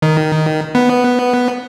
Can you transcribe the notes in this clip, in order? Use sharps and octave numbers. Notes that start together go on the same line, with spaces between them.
D#3
B3